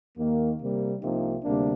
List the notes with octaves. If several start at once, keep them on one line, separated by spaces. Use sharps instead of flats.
D#2 D#3 A#3
C3 G3 A#3
C2 C3 F3 A#3 D#4
D2 C3 G3 A#3 D4